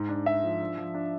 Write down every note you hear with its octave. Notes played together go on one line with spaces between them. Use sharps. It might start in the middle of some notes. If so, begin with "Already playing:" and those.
Already playing: G#2
D4
D4 E5
F3
D4
F3
D4